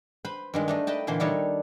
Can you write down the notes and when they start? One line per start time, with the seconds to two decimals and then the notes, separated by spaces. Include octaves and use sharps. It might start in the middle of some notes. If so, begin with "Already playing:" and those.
0.25 B4 C5 B5
0.54 G2 D#3 G#3
0.68 A3 D4 D#4
0.87 B4 D#5 G5 A5
1.07 A#2 D3 E3 C5
1.20 D#3 G3 D4 D#4 A4 C#5